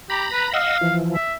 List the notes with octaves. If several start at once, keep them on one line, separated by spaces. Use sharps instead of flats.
G4 A#5 B5
B4
D#5 F5 F#5 E6
E3 F3
E5